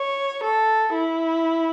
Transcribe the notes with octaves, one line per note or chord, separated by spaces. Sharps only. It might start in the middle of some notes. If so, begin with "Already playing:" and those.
Already playing: C#5
A4
E4